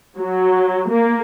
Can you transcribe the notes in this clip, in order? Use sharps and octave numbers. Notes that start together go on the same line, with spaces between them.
F#3
A#3